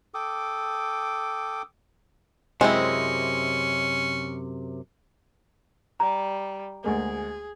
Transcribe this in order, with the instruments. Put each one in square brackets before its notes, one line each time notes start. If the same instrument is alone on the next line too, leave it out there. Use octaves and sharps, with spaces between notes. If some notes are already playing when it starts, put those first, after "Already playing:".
[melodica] A4 G5 D6 D#6
[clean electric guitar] F#2 C3 [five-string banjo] G#3 C4 E4 [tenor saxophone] C#4
[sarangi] G3 [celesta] A#5
[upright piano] D2 G#3 A#3 [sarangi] G#4